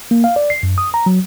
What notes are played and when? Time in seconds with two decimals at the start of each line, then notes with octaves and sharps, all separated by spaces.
0.11 A#3
0.24 F5
0.36 D5
0.50 C7
0.63 F#2
0.78 D#6
0.94 A#5
1.06 F#3